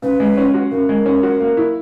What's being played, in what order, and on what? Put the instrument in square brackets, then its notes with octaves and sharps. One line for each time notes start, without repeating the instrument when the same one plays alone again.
[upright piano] C#3 [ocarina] B4
[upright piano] G#3
C#4
F#4
[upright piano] C#3 [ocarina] A#4
[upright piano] G#3
C#4
F#4
A#3
E4